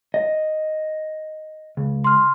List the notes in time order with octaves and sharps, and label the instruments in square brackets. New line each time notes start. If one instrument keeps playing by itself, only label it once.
[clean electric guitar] D#5
C#2
[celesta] C6 F6